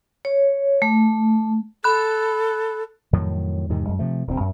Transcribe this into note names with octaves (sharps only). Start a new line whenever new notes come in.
C#5
A3
A4 B5 F#6
F2 A2 D#3 F#3
E2 G#2 C3 D#3
F#2 G#3
C3 F3 A3
D#1 D2 B3 C4
F#2